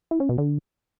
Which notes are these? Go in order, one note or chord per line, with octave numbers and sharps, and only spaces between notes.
E4
C#4
B2
D3